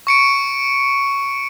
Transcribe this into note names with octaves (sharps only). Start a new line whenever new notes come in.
C#6 C#7 D7